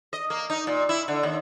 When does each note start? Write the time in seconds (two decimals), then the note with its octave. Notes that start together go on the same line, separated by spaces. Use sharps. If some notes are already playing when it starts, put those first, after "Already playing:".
0.13 D#5
0.30 A#3
0.50 D#4
0.67 A#2
0.89 E4
1.08 D3
1.23 D#2